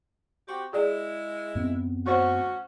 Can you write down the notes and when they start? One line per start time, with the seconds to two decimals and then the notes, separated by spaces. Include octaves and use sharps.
0.48 C4 F#4 G4
0.73 G#3 E4 G#4 D5
1.55 F#2 B3 C4
2.06 D2 C#4 F#4 C5 C#5 C#6